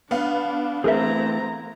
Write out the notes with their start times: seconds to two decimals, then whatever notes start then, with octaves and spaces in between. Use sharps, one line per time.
0.11 B3 D4 F5
0.84 E3 A3 C4 G#4 A#4 E5 A#5